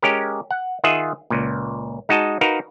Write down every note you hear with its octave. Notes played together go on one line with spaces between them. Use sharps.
G#3 C#4 G4 A#4
F#5
D#3 F4 G#4 D#5 E5 F#5
C#2 A#2
G#3 D#4 F#4 D#5 A5
D#4 F#4 A#4 B4 F5